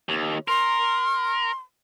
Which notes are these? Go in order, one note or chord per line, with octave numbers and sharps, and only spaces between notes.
D#2
A#4 C6